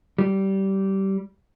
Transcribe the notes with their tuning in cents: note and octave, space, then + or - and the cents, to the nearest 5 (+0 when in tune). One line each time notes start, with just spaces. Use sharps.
G3 -20